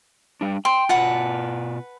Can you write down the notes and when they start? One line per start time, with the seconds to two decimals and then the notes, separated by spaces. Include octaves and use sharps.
0.41 G3 D4
0.65 G5 C6
0.89 B2 F4 B4 F#5 A5